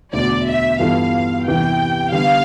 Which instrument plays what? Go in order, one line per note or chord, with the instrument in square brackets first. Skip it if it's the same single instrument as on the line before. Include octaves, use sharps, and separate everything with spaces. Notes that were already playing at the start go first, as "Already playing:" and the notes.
[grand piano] E1 D2 D3 [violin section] D5
[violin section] E5
[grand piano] G2 E3 B3 F4 A4 [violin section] F5
[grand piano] E2 C3 E3 G3 [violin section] G5
[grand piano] D3 G3 B3 [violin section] F5